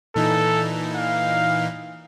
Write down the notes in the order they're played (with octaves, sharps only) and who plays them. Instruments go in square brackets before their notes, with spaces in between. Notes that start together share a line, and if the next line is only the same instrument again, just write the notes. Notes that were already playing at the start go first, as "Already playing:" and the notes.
[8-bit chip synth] A#2 E3 D#4 [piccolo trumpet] A4
[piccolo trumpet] F5